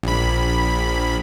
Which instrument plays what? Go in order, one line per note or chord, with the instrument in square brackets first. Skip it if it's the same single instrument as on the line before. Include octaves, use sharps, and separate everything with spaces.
[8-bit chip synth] A#1 B5